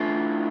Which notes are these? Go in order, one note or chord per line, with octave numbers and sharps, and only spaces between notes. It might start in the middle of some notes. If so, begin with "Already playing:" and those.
Already playing: A3 D4 F4 B4
E4